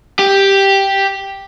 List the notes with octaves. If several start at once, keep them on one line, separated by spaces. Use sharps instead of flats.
G4